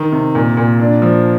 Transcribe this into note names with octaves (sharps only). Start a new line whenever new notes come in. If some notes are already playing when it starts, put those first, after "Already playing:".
Already playing: D#3
C3
A#2
A#2
D4
F3